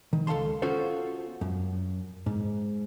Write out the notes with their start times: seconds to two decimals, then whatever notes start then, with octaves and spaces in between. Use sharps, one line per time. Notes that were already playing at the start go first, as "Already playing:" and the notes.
0.13 D#3
0.27 C#2 A4 F5 A5 C6
0.62 B3 C#4 F4 F#4 A4 C5
1.41 F#2
2.26 G#2